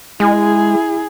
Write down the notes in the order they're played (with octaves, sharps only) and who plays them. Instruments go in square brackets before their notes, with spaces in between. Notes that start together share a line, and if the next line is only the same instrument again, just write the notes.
[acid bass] G#3 [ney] E4 [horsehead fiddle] G#4